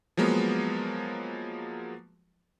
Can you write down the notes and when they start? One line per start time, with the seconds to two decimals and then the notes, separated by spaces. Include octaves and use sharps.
0.17 F3 F#3 G#3 A#3 B3